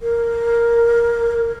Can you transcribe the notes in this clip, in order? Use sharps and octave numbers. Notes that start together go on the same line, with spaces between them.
A#4